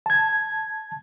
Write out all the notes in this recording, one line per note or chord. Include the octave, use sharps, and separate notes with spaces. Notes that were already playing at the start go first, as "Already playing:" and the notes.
A5 G#6